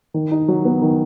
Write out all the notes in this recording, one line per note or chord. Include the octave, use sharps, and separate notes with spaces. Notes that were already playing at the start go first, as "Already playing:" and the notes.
D#3
D#4
F#3
B3
D#3